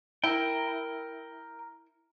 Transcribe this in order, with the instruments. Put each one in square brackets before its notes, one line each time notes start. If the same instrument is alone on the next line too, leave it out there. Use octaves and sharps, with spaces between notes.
[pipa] E4 [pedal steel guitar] A#4 G5